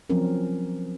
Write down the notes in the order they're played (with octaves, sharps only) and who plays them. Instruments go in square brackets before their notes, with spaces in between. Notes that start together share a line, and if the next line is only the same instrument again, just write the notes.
[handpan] F3 F#3 C4 C#4 A#4